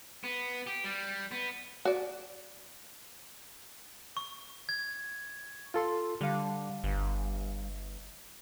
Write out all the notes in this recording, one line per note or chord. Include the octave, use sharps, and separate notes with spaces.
B3
G4
G3
B3
F#4 D5
C#6
G#6
F4 A4 C6
D3 G3 F5
G1